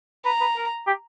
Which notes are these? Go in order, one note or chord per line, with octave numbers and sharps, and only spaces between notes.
B4 A#5
B4
A#4
G4